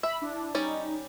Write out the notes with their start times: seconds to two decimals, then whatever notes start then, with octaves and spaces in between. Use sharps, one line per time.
0.03 E5 B5
0.22 D4 E4
0.55 G3 C#4 D#4 D5